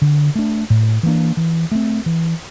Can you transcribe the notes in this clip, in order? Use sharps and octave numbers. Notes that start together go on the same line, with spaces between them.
D3
A3 D4
A2
E3 A#3 D4
E3
A3 C4
E3